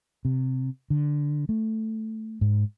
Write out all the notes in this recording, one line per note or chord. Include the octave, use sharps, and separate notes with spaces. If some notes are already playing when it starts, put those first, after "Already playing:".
C3
D3
A3
G#2